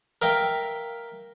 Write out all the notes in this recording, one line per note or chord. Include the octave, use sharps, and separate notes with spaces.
A#4 E5 F5 G5